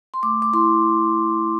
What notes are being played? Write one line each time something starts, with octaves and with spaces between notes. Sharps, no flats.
C6
A3 D6
D6
E4 C6